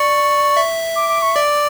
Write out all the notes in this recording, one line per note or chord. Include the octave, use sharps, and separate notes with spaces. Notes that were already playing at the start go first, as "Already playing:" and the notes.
Already playing: D5 C#6
E5
D6
D6
C#6
D5 D6